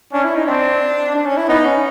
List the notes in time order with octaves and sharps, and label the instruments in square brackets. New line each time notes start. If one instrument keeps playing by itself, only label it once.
[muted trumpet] C#4 [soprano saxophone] D4
[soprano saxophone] E4
D#4
[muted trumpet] C4 [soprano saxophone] D4
[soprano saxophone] D4
C#4
E4
[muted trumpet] B3 [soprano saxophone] D#4
[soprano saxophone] C#4